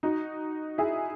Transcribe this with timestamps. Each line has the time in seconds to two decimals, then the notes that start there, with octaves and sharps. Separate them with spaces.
0.03 D#4 F#4
0.78 E4 G#4